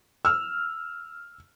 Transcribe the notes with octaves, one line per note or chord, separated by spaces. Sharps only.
E6 F6